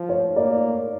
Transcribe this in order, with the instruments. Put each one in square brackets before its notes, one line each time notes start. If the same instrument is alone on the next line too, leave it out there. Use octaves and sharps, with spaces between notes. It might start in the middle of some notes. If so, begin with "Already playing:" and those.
Already playing: [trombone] F3
[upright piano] C#5
[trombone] A#3 [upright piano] D5